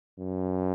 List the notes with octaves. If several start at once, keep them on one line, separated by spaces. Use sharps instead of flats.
F#2